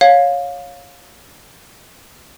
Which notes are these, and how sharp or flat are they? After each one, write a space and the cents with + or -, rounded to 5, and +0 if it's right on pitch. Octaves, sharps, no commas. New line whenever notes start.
C#5 +0 F5 +20